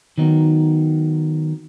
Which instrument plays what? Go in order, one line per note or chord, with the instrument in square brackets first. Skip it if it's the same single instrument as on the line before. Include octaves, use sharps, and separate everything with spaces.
[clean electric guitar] D#3 F#3 B3 D#4